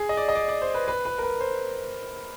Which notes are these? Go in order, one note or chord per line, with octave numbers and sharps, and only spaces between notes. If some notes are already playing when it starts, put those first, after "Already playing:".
Already playing: G#4
D#5
D5
D#5
D5
D5
C5
B4
B4
B4
A#4
B4
C5